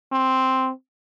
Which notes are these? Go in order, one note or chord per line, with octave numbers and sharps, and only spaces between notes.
C4